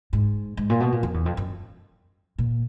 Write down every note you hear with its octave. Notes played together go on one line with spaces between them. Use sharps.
G#2
G#2
A#2
B2
A#2
F2
E2
F2
F#2
A#2